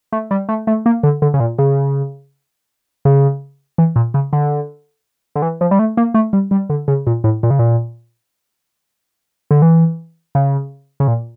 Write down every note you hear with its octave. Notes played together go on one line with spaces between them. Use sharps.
A3
G3
A3
A3
A#3
D3
D3
C#3
A#2
C#3
C#3
E3
A#2
C#3
D3
D3
E3
F3
G3
A3
A#3
A3
G3
G3
D3
C#3
A#2
A2
A#2
C#3
A#2
D3
E3
C#3
C#3
A#2